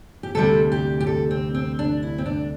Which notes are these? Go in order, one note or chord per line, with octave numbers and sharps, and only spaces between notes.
G4
D2 C3 G3 A4
G4
G4
A4
C4
C4
D4
E4
C4
D4